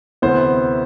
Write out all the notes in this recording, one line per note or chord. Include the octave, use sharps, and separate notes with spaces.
D2 C3 E3 B3 C5